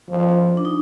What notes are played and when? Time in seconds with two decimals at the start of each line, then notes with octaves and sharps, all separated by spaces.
0.09 F3
0.57 D4
0.65 D#4